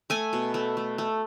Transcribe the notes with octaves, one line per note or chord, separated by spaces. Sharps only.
A3 G#5
B2
A3
A3
A3